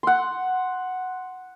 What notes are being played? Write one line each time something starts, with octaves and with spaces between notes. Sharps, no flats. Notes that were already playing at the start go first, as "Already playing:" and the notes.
F#5 C6